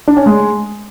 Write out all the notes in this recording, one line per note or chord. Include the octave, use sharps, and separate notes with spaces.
D4
C#4
G#3